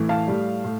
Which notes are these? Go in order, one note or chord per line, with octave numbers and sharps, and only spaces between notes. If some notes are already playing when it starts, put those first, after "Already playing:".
Already playing: A2 E3
F5 A5
A2 G3
A2